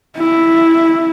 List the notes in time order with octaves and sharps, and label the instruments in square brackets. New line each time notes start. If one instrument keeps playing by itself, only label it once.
[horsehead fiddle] E4